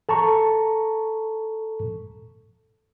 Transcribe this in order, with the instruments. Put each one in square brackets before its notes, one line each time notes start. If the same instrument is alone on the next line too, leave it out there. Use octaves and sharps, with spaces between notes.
[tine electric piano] A4 A5 A#5 C#6